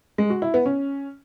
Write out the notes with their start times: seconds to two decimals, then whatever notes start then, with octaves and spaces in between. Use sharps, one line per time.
0.18 G#3
0.30 F#4
0.42 E4
0.54 B3
0.66 C#4